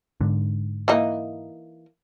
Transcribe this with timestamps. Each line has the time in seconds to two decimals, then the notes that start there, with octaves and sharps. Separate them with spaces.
0.21 G#2 D3
0.88 E3 A#3 D#4